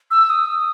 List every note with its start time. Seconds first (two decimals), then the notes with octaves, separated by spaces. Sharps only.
0.11 E6
0.30 D#6
0.50 D#6